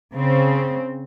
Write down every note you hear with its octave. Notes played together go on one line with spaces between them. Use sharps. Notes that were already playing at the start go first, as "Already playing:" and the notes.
C#3 C4